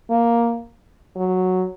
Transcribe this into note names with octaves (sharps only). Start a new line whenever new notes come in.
A#3
F#3